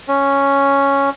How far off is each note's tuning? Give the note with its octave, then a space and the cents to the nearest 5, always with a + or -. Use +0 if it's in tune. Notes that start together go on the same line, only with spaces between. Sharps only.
C#4 +0